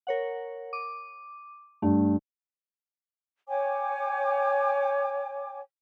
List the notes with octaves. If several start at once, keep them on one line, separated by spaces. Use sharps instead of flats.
A#4 C#5 F#5
D6 D#7
G2 A3
C#5 G5 G#5 D6